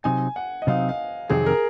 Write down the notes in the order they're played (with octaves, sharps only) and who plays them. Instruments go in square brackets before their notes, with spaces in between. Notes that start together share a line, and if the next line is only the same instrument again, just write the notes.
[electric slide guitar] C3 F#3 C4 D#4 [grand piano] G#5
[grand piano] F#5
D#5
[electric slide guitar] C3 F#3 C4 D#4 [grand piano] F5
[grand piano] F5
[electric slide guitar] F2 C3 D#3 F#3 C4 [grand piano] G#4
[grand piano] A#4